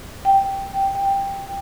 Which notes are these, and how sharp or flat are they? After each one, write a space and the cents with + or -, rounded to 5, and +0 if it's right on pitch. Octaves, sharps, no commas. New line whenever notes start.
G5 +0
G5 +10